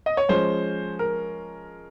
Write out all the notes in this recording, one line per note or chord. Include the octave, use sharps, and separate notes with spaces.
D#5
C#5
F3 G#3 C#4 C5
A#4